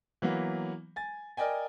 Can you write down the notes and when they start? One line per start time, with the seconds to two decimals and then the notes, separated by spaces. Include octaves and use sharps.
0.22 E3 F#3 A#3 B3
0.96 G#5 A6
1.37 A#4 D5 D#5 G5 G#5